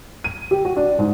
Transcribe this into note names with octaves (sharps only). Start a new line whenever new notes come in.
D#7
G4
F#4
D4
G#2